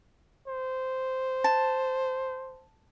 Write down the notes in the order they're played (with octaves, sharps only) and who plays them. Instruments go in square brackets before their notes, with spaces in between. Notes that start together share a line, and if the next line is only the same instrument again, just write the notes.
[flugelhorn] C5
[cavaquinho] A5